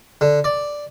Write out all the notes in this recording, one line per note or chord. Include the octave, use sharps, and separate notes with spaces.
D3
D5